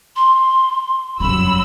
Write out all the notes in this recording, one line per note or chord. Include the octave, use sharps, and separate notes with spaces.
C6
F#2 F#3 G3 B5 E6